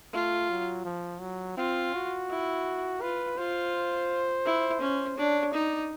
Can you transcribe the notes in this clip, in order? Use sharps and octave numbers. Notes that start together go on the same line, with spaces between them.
A3 F4
F#3
F3
F#3
C4 F4
F#4
E4
F4 B4
F4 C5
E4
C#4
D4 C#5
D#4 D5